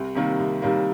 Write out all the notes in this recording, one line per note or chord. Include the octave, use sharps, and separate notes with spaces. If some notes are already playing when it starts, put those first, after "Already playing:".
Already playing: C2
C3 D#3 G3 A#3
C2
C3 D#3 G3 A#3